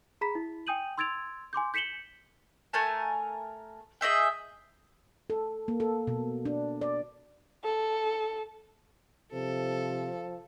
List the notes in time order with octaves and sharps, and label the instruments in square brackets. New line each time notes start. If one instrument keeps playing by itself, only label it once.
[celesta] G#4 A#5 B5 B6
E4
G5 G#5 D#6 G6 D#7 F#7
C6 E6 G#6 A6 D7 F7
G#5 C6 D6 G6
G6 B6 C#7 E7 F#7 G7
[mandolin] A3 A#4 G#5 A5
G#4 D#5 E5 G5
[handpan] A4
A#3
A4
B2
D4
D5
[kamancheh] A4
[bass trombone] C3 [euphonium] F3 [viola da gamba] A4